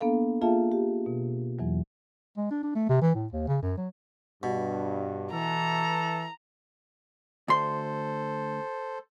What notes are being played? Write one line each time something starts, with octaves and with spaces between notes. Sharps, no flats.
A#3 B3 D4 A4 F5
A#3 F4 G#4 E5 F5 A5
G4
B2
E2 E3 F#3
G#3
D4
D4
A3
C3
E3
A2
D#2
C#3
F#2
F#3
G2 B2
E3 A4 A#5
D2 A4 C5 C6